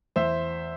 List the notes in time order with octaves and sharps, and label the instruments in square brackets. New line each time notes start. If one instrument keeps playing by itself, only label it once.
[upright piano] E2 [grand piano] C5 E5